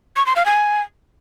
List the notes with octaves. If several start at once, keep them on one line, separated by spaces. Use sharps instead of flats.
C#6
C6
F5
G#5